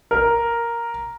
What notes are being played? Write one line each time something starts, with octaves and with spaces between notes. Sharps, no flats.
A#4